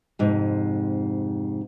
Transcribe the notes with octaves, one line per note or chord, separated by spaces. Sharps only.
F2 G#2 C3